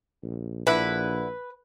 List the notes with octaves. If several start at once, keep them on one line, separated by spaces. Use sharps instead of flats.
A#1
A#1 D3 E4 B4